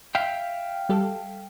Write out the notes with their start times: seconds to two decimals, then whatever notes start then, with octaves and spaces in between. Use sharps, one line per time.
0.15 E5 F5 G5
0.89 G3 G4 A4